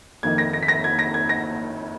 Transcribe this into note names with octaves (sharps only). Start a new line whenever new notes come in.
F2 D#3 A#3 D#4 G#6
A#6
A#6
B6
A#6
G#6
A#6
G#6
A#6